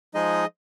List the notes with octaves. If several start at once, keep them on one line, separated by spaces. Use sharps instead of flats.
F3 G#3 D#4 G#4 D#5